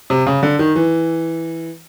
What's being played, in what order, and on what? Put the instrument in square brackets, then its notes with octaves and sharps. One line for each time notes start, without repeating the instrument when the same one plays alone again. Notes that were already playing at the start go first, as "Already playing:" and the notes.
[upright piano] C3
C#3
D3
D#3
E3